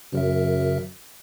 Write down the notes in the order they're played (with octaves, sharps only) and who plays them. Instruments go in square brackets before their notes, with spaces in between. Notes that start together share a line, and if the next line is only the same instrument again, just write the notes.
[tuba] F#2 [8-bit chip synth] C#3 A#4 E5